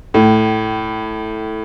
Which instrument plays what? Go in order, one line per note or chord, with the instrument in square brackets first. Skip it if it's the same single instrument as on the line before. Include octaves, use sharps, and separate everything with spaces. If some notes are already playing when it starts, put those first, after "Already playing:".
[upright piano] A2